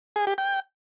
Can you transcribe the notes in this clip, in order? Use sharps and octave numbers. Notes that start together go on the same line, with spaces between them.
G#4
G4
G5